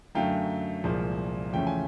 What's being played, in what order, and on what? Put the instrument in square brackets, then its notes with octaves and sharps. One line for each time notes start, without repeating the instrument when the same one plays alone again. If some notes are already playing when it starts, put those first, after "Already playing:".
[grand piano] F#2 D3 F#3 A3 F5 G5
C2 A#2 F3 G#3
E2 C#3 F3 A3 C#4 G5
G#5